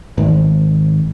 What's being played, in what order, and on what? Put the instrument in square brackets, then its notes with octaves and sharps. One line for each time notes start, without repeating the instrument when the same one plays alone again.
[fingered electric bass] G#1